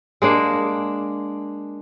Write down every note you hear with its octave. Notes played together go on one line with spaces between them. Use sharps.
G#3 A#3 D4